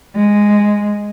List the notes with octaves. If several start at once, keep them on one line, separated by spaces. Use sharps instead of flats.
G#3